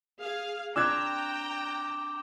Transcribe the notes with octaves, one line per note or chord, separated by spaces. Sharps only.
G#4 F5
C4 D4 G5 A#5 D6 E6 F#6 G#6